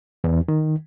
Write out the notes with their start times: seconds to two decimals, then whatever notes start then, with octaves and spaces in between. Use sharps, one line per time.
0.24 E2
0.48 D#3